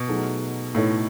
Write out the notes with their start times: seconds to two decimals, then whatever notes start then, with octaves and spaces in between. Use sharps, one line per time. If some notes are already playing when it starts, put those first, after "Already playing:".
Already playing: B2
0.08 F#3 A3 D#4 G#4
0.75 A2 E3 A3 D#4 A4 C#5